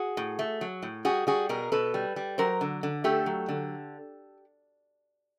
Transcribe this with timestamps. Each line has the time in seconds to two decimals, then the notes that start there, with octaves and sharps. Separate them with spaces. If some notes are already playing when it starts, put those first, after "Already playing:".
Already playing: F#4 G#4
0.17 A2
0.39 A3
0.61 F#3
0.83 A2
1.05 G3 F#4 G#4
1.27 G3 F#4 G#4
1.49 B2 G#4 A#4
1.72 B2 A4 B4
1.94 G3
2.16 G3
2.38 F#3 A#4 C5
2.61 D3
2.83 D3
3.04 A3 G4 A4
3.26 F#3
3.49 D3